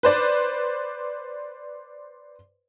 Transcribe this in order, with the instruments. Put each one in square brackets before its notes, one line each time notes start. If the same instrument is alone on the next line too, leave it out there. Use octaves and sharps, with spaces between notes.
[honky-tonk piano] B4 C5 D5